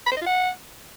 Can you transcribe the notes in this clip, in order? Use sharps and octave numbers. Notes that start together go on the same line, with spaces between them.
B5
C5
D#5
F4
F#5